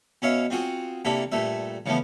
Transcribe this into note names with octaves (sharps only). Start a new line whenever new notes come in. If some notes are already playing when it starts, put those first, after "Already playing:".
B2 C#4 C#5 E5 F5
C4 F4 F#4 G#4
C3 A#3 D4 E4 A4
G2 A#2 A3 E5
C#3 E3 F3 A3 B3